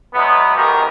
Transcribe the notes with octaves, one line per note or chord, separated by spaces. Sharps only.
E2 F#3 G#3 B3
F2 G#2 B2 D#3 G4 A#4